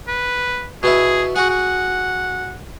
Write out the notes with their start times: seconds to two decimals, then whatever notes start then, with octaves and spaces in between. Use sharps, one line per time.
0.08 B4
0.83 B2 B3 E4 G#4
1.36 F#4 G#4 F#5
1.50 F#5